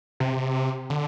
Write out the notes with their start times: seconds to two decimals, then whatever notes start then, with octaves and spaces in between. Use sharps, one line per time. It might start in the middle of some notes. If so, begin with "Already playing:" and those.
0.20 C3
0.90 D3